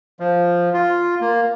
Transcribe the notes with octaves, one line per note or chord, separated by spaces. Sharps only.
F3
F4
A#3